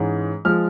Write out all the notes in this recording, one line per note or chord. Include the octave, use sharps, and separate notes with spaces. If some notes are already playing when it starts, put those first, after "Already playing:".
Already playing: G#2 E3 G#3 C#4
F3 G#3 F6